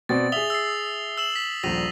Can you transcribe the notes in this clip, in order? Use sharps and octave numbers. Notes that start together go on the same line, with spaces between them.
B2 C4 D5 A6
G#4 E5 D#6 F7 G7
E6 A6 C7
E6 E7 F#7
B6
D#1 A#1 A#6 D#7 F7